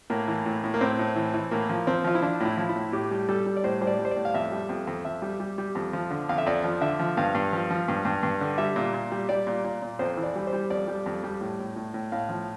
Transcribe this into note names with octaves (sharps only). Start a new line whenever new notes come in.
A2 A#3
E3
A2
A2
A#3
A2 C4
A2
E3
E3
A2 A#3
F3
F3 C4
F3 F4
E4
F3 D4
A2 E4
F3
E4
A2
A2 G4
G3
G3 A4
G3
D5
A2 C5
G3 C5
D5
G3
C5
D5
A2
F5
F2 E5
G3
F2
F2
F2 E5
G3
G3
G3
F2
F3
D3
F2 F5
E5
F2 D5
F3
D3 E5
F3
G2 F5
G2
F3
F3
G2
G2
G2
D3
G3 E5
A#2
A#2
G3
G3 D5
A#2
A#2
A#2
F2 C5
E3
D5
G3
C5
G3
F2 D5
G3
F2
G3
A2
A2
A2
A2
A2 F5
F3